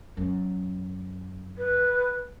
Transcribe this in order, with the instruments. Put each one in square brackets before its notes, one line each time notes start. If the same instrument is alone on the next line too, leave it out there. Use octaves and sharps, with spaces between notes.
[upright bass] F#2
[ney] B4